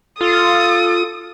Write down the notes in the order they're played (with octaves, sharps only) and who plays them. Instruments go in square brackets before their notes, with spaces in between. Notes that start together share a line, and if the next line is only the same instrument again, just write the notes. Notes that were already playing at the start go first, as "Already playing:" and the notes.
[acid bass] F4 [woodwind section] A4 [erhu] D#6